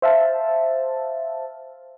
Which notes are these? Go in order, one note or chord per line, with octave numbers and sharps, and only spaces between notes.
C5 E5 F5 A5